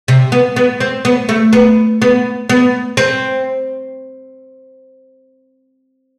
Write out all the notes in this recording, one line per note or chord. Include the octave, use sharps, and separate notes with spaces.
C3
B3
B3
C4
B3
A3
B3
B3
B3
C4